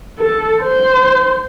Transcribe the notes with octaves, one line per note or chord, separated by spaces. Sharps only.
A4
C5